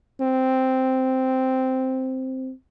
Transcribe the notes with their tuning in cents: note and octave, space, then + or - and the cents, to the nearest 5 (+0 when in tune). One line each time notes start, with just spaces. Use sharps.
C4 -5